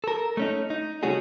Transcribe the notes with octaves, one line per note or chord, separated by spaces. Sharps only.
A4 A#4
A3 C#4 D#4
D#4
C#3 G3 A3 C#4 F#4 G#4